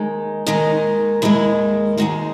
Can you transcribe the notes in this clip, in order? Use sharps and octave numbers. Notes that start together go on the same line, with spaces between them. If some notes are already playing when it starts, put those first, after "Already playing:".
Already playing: D#2 D#3 G#3
D#2 D#3 G#3 D#4
D#2 D#3 G#3 E4
D#2 D#3 G#3 F#4